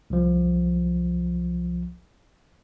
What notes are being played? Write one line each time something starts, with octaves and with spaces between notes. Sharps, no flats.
C2 F3